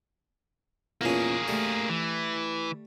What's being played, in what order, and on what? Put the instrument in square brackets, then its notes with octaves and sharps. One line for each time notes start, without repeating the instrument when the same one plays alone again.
[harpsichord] E2 A#2 C#4 [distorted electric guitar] A#3 G#4
[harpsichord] G3 A3
[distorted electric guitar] E3